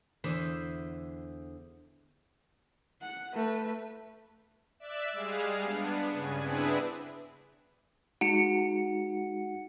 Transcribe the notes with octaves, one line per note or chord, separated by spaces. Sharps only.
E2 D3 C5 E5
F#5
A3 B4
D5 E5 F#6 E7
G3 G#3 G#4 F5
B3 D4
G2 C#3 G#5
B3 C4 D4 E4 G#4 B4
G#3 D#4 F#4 F#5 C#7